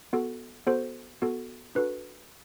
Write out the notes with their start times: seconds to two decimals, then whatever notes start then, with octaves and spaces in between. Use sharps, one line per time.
0.13 B3 F#4 A4
0.67 B3 F#4 A4 C5
1.22 B3 F#4 A4
1.75 D4 F#4 A4 B4